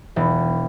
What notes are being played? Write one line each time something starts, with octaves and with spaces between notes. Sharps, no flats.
E1